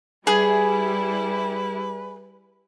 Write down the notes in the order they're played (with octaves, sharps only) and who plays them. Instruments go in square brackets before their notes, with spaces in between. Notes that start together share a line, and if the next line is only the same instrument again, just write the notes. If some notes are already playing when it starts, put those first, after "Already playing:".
[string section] G3 E4 [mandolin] G#4 [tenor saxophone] B4